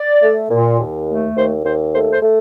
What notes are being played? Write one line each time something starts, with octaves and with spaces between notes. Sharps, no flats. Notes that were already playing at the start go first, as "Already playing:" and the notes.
Already playing: D5
A3
A#2
D#2
A3
D#2 C5
D#2 C5
A3 C5
C5
A3